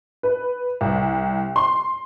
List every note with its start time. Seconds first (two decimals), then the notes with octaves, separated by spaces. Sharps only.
0.23 B4
0.81 C2
1.56 C6